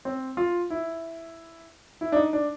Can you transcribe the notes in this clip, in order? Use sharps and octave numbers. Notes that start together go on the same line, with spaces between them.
C4
F4
E4
E4
D4
D#4
D4